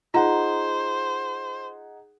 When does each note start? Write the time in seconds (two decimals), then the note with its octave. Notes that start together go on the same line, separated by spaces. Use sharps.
0.14 D#4 F4 G#4 C5 F#5 A#5